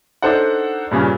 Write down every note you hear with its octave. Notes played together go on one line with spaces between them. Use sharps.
D4 D#4 A4 C5 F#5
G2 A#2 C#3 C#4